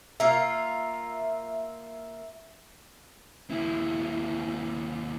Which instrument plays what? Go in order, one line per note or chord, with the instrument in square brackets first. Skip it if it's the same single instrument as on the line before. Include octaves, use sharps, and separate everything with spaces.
[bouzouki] A#3 F4 [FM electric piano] E5
[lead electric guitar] D#2 E4